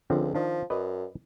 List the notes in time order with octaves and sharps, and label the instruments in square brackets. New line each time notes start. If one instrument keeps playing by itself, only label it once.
[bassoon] C#2 [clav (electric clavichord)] D3 F3 C4
[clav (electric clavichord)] D#3 D4 [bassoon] F3
[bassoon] F#2 [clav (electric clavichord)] B4 D5 D#5